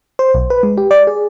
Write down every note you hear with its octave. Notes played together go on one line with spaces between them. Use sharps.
C5
B1
B4
G#3
G4
D5
G#4